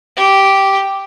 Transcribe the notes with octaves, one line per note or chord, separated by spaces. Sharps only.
G4